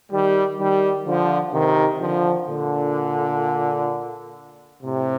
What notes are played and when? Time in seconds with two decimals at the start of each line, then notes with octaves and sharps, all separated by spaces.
0.11 D#3 G3
0.58 D#3 G3
1.05 D3 F3
1.52 C3 D#3
2.00 D3 F3
2.47 A#2 D3
4.83 A2 C3